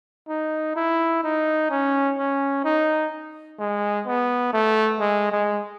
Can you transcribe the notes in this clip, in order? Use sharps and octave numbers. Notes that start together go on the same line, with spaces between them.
D#4
E4
D#4
C#4
C#4
D#4
G#3
B3
A3
G#3
G#3